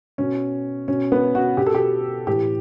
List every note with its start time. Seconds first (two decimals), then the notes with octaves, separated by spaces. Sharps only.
0.18 B2 C#4
0.88 B2 C#4
1.12 B3
1.35 F#4
1.57 B2 G4
1.66 A4
1.74 G4
2.27 A2 E3 G4